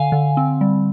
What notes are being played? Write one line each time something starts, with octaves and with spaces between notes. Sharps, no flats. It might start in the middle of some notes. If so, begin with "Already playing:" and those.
Already playing: D3 F5 G#5
D3
C4
G3